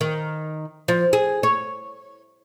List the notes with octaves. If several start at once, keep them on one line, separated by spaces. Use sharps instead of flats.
D#3
F3
G#4
C#5